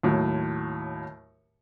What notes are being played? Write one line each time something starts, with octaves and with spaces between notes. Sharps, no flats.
D#2 A2 F#3